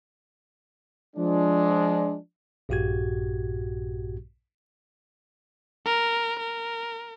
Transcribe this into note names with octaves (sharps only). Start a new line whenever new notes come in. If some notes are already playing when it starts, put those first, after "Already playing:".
F3 G#3 D4
A#1 G2 A#2 F#4 G4 G#6
A#4
A#4